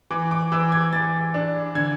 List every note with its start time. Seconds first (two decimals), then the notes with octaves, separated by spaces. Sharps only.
0.11 E3 D6
0.31 D6
0.52 E3 E6
0.72 G#6
0.93 E3 A6
1.34 D4
1.75 D3 G#6